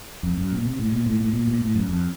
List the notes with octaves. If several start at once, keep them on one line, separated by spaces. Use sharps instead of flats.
F2
F#2
A#2
C3
A2
A#2
A2
A2
A#2
A#2
A2
F#2
F2